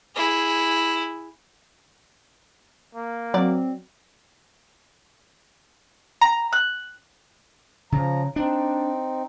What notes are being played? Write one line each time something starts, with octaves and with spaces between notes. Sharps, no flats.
E4 G#4
A#3
F#3 C4 D5
A#5
F#6
C#3 F3 A#5
C4 D4 D#4